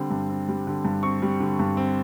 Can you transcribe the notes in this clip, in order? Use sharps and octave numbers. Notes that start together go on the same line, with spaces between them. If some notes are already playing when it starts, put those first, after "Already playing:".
Already playing: D3 G3 C4
G2
C4
G3
D3
G2
C4 C#6
G3
D3
G2
C4